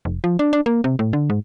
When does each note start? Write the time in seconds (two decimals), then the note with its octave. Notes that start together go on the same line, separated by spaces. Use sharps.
0.05 F1
0.24 F3
0.39 D4
0.53 D4
0.66 A#3
0.84 C3
0.99 A2
1.13 D3
1.30 G#2